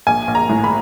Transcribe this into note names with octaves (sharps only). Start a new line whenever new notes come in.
A#1 G#5
A#1
A#5
A2
B5